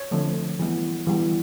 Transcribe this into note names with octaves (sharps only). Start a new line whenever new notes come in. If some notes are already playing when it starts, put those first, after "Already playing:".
Already playing: C#5
D3 F3 A3 C4
E3 G3 B3
E3 G3 B3